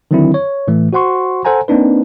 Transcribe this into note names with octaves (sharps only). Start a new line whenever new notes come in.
D3 D#3 F#3 C4 D4 E4
C#5
A2 E3 A3
F#4 C5 F#5 C6 C#6
A4 C5 F#5 G#5 A#5
A#3 C4 D4 D#4 B4